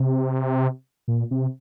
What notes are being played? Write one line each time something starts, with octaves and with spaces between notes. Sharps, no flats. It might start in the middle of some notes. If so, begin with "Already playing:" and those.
Already playing: C3
A#2
C3